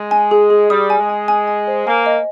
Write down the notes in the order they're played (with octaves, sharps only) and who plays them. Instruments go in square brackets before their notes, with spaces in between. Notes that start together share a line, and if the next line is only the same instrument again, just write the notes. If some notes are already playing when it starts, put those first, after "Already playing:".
Already playing: [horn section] G#3
[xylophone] G#5
G#4
G#4
[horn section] G3 [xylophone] D#6
[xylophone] G#5
[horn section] G#3
[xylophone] G#5
G#5
G#5
C5
[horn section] A#3 [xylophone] G#5
[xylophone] D#5